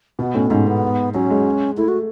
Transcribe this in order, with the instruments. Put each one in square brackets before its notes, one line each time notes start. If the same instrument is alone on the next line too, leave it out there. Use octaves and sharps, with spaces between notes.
[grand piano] B2 [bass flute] B3
[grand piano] A2 [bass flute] C#4
[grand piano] G#2 [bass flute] C#4
[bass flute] B3
[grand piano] F#3 [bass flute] C#4
[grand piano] G#3
[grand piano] A3 [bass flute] E4
[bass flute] F#4